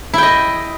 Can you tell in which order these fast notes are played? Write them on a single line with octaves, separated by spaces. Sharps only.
E4 G5 D#5